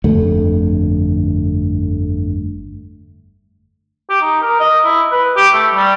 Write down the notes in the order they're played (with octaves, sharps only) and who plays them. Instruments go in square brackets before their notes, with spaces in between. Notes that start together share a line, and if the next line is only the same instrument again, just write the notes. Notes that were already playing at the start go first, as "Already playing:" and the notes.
[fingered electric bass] G1 F2 D3 A3
[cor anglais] G4
D#4
A#4
D#5
E4
B4
G4
A3
G3